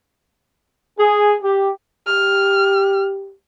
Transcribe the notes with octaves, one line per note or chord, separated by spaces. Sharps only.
G#4
G4
G4 F6